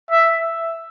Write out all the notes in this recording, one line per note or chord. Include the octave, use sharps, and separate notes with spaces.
E5